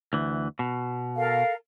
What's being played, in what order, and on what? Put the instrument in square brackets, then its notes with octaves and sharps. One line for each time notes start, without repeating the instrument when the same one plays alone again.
[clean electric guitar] D2 E3
B2
[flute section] A4 A#4 F5